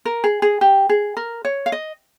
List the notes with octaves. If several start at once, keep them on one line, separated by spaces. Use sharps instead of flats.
A#4
G#4
G#4
G4
G#4
A#4
C#5
F5
D#5